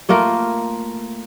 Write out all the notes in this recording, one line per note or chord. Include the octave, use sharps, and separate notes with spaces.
A3 A#3 F4 A#4